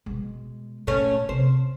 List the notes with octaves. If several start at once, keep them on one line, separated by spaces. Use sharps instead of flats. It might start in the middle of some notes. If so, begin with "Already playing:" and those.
B2 G#3
A#2 A3 C#4
C3 C5